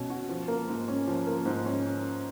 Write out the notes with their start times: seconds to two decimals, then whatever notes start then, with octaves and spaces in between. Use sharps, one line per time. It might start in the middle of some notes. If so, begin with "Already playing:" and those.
Already playing: B2 C#4
0.10 F#4
0.29 F3
0.48 A#3
0.68 G#2
0.88 C#4
1.07 F3
1.27 A#3
1.45 G#2
1.66 C#4